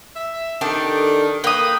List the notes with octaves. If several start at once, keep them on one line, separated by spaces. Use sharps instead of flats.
E5
D#3 D4 G4 A4
A#3 B4 G5 D#6